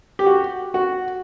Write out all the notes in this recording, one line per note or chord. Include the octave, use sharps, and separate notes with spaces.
G4
F#4
F#4